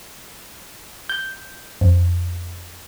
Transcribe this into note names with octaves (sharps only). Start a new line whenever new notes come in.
G6
F2